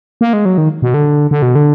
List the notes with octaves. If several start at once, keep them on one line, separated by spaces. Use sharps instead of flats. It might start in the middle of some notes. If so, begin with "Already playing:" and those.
A#3
G#3
F#3
D#3
B2
D3
D3
B2
D3